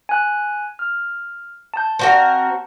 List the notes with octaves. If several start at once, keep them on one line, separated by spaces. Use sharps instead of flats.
G#5 F#6
F6
A5 G6
C4 F#4 A#4